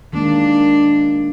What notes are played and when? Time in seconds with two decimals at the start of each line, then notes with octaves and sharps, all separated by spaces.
0.13 D#3 G#3 A#3 D4